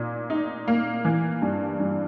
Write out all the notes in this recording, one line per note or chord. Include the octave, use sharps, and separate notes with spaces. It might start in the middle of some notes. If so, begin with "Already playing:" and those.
Already playing: A#2 D#4
D#4
A#3
E3
G2
G2